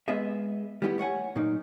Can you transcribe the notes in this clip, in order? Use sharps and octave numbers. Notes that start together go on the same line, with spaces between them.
G#3 B3 G#4 B4 D#5 E5
G3 A3 B3 E4 F#4 G4
A3 C#5 F#5 G#5
A#2 F#3 A#3 D#4